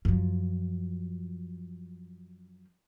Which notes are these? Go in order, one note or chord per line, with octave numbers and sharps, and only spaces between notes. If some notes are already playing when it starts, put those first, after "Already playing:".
F#2 F3